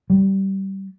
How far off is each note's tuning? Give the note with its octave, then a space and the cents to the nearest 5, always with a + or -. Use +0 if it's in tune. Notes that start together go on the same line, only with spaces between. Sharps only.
G3 -20